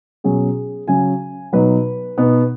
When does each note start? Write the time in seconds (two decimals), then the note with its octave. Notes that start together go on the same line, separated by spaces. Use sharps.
0.24 B2 F#3 C#4 G#4
0.88 C#3 F#3 C#4 G#5
1.53 B2 F#3 D#4 B4
2.18 B2 B3 D#4